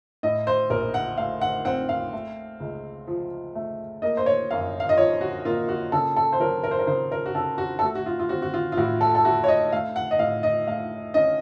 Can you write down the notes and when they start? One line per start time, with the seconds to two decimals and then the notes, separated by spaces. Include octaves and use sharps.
0.23 A2 D#5
0.47 C5
0.70 A#1 A#4
0.94 F#5
1.18 A3 F5
1.41 F#5
1.65 C4 F#5
1.89 F5
2.13 A3
2.60 C#2
3.07 F3
3.55 A3
4.02 A#3 D#5
4.17 C5
4.26 C#5
4.50 F#2 F5
4.80 F5
4.89 D#5
4.97 F3 C#5
5.21 F#4
5.45 A#3 F4
5.69 F#4
5.92 C#3 A4
6.16 A4
6.33 C5
6.40 F#3 A#4
6.64 A#4
6.71 C5
6.79 A#4
6.87 C#3 C5
7.12 A#4
7.26 F#4
7.35 C#3 A4
7.58 F#4
7.79 A4
7.82 A3 F#4
7.95 F#4
8.06 F4
8.20 F4
8.29 C4 F#4
8.42 F#4
8.54 F4
8.72 F4
8.77 A2 F#4
9.01 A4
9.15 A4
9.25 A3 F#4
9.44 C#5
9.48 D#5
9.72 A3 F5
9.96 F#5
10.11 D#5
10.19 A2 F5
10.43 D#5
10.67 A3 F5
11.14 C#4 D#5